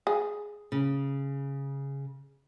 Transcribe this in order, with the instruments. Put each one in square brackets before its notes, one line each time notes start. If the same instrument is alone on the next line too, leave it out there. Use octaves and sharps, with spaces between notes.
[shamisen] G#4
[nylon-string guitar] C#3